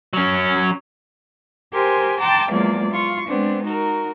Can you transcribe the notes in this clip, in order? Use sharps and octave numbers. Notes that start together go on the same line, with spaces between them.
F#3 C#4
G4 A#4 C5 G#5 C6
G5 A5 A#5 C6 D6
E2 F3 F#3 G#3 A#3 D5
F4 C#6
G#3 B3 C4 D4
D#4 F#4 A#4